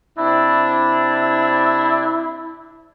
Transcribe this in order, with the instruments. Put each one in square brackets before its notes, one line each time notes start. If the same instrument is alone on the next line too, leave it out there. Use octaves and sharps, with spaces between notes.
[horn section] C3 C4 D4 [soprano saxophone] E4